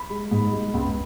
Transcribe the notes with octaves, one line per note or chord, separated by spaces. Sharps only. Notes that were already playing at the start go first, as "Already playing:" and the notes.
Already playing: B5
G#3
G#2
G#3
C#2